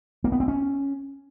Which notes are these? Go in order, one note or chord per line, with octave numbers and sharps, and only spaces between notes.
A#3
B3
C4
C#4